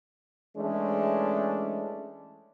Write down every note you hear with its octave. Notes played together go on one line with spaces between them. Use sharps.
E3 G#3 A3 C#4 D4